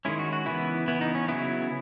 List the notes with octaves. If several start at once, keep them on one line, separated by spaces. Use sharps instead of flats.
D#3 G#3 C#4 E4
F#4
F#4
C#3 E3 B3 E4
E3 B3 E4
D#4
C#4
C#3 F#3 B3 E4